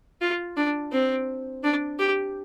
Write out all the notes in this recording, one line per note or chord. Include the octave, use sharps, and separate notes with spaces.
F4
D4
C4
D4
G4